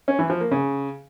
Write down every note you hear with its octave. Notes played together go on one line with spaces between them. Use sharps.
C#4
E3
F3
A#3
C#3